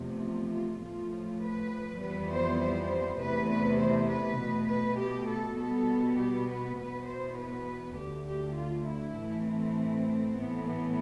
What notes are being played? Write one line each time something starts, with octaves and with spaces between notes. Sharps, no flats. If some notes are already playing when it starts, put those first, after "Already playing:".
Already playing: E2 C3 F3 A3
F4
F4
A2 F3 A3 F4
B4
F2 E3 G3 B3 B4
C5
C5
E2 C3 E3 A3 B4
B4
C5
B4
B2 A3
B4
G4
A4
B2 G3 B3 A4
G4
B4
E2 B2 B3 B4
C5
B4
D2 D3 A3 G4
G4
F4
E4
A2 E3 A3
C4
A2 E3 B3
B3